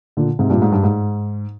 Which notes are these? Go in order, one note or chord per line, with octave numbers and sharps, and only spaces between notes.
A#2 D3
G#2 C3
G2 A#2
G#2
G2
G#2